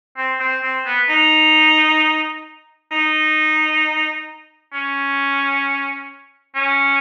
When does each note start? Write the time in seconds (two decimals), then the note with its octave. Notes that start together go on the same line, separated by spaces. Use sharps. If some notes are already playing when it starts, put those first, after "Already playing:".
0.17 C4
0.40 C4
0.63 C4
0.85 B3
1.09 D#4
2.91 D#4
4.73 C#4
6.55 C#4